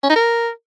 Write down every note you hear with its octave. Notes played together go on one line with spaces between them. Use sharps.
C#4
D#4
A#4